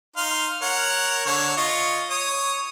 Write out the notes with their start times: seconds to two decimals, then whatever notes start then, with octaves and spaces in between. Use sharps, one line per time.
0.16 D#4 F5 C6
0.62 A#4 C#5 F#5
1.26 D3 C#5
1.57 F4 D#5 C#6
2.10 C#5 D#6